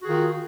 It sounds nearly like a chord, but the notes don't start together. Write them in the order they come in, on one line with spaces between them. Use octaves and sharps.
F#4 G#4 D#3 F4